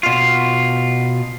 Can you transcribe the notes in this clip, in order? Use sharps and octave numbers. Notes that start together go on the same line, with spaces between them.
B2 F4